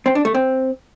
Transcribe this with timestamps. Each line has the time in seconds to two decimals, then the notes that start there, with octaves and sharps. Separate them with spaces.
0.06 C4
0.15 D4
0.25 A3
0.34 C4